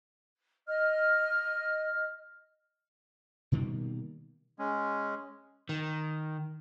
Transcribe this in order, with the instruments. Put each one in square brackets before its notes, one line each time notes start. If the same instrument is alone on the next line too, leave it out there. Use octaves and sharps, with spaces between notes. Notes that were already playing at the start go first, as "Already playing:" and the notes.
[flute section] D#5 F6
[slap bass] B2 D#3 G3 A#3
[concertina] G#3 C#4
[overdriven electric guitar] D#3